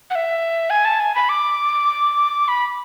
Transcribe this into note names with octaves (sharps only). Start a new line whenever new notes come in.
F#5
E5
G#5
A5
G#5
B5
D6
B5